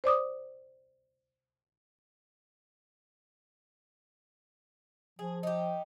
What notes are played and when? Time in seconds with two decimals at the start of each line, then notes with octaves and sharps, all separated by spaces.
0.04 C5 D5 D6 D#6
5.19 F3 G#4
5.43 D#4 G4